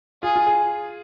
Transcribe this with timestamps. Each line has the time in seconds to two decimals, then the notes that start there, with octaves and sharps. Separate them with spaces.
0.23 F4 G#4
0.36 F4
0.47 G#4